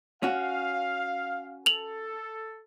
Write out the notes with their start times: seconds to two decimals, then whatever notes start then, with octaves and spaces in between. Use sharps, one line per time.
0.23 C#4 F#4 F5
1.66 A4 F7 F#7